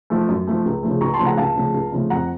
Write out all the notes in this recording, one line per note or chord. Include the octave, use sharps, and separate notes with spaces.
F3 A3
F#2
F3 A3
C#2
C#3 F3 A3
C#2 A#5 C#6
A5 C6
C#3 F3 A3
F#5 A#5
C#2 F5 A5
C#3 F3 A3
C#2
C#3 F3 A3
F2 F#5 A#5